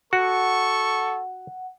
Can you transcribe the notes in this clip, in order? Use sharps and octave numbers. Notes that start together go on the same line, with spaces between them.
F#4 A4 F#5 C#6